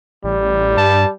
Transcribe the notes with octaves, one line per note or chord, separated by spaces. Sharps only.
A1 G3
G2 A5